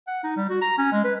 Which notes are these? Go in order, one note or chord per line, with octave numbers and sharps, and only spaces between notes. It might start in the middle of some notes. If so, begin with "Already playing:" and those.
F#5
D#4
G3
F#4
A#5
C#4
G#3
B4